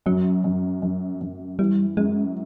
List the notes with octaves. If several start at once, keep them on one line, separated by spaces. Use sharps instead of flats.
F#2 F#3
F#2
F#2
F#2
E3 G3
F#2 G#3